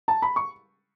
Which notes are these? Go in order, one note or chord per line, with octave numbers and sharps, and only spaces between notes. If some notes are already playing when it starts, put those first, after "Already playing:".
A5
B5
C#6